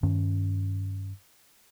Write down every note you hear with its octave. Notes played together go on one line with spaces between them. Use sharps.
G2 D#3 C#4